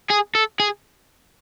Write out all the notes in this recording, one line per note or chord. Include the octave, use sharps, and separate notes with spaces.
G#4
A4
G#4